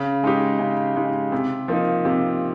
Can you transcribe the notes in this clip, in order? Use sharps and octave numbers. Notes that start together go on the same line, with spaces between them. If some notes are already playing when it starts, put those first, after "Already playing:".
Already playing: C#3
G#3 D#4 G4
C#3
G#3 D#4 G4
C3
F3 A#3 D#4
C3